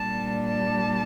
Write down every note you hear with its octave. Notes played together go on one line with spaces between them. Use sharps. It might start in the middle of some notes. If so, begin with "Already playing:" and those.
Already playing: A#2 G3 D4 A5
A5